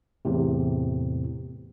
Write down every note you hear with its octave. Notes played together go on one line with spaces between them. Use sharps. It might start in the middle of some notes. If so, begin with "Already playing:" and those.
E2 A2 C3